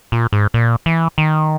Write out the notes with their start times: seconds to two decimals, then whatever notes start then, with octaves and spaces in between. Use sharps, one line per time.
0.12 A#2
0.33 G#2
0.54 A#2
0.86 E3
1.18 D#3